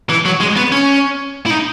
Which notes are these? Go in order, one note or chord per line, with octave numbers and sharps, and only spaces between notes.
E3
F#3
G#3
B3
C#4
E4
D#4